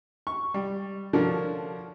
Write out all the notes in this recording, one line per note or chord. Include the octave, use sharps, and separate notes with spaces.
C#6
G3
D3 F3 C#4 D4 F#4 A#4